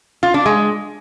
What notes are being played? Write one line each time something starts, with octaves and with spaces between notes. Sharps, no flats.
F4
D4
G#3